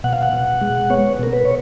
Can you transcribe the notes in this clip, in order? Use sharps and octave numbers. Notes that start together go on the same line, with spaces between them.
B2 F#5
F5
F#5
B2
G#3
B3 C#5
B2 A#4
B4
C#5